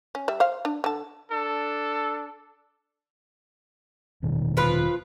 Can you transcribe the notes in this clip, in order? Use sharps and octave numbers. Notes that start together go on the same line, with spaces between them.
C#4
G3 E5
C5 F5
D4
D3 A5
D4 A4
E1 B2 D#3
F3 F4 B4